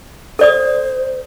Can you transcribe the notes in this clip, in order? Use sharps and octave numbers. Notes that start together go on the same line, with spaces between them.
A4 C5 D5 D#6